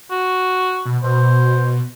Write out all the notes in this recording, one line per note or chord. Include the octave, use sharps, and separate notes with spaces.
F#4
B2
B2 C5